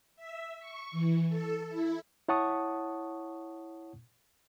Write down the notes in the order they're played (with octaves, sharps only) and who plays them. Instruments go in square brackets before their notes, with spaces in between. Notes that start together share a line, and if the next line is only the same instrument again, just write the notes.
[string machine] E5
C#6
E3
A4
E4
[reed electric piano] E4 C#5 F#5 A5 C#6 D#6